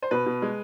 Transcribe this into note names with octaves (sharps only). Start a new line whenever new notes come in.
C5
B2 B4
B2
G#3